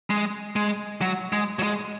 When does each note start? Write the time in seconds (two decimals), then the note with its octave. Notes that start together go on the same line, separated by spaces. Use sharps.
0.10 G#3
0.56 G#3
1.01 F#3
1.33 G#3
1.59 F#3
1.63 G#3